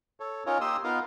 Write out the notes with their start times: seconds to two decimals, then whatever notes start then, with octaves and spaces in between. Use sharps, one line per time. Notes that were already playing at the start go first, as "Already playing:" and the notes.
0.20 A4 C#5
0.46 C#4 D#4 F4 A#4 C#5
0.61 A#3 D#4 G4 C6 D#6 E6
0.84 B3 D#4 F4 A#4 F5